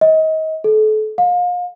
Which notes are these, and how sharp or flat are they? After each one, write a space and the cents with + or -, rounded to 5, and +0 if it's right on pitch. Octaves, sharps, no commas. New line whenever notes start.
D#5 +30
A4 -35
F5 +35